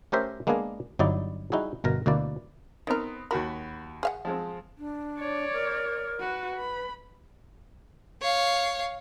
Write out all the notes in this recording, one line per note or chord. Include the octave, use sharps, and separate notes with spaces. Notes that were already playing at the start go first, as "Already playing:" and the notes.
A3 C#4 G4 A#4 C5 E5
G#3 A#3 B3 D4 G#4 A#4
G1 G2 F#3 D#4 E4 D5
G3 D#4 E4 F#4 G#4
G1 B2 A#4 A#5
D2 B2 A#3 E4 D5
D#3 B3 C4 D#4 A#4
D#2 F#4 A#4 B5
G#4 F5 F#5
F3 G#3 C4
D4
C#5 D5
A#4
F#4 B4
B4 B5
C#5 F5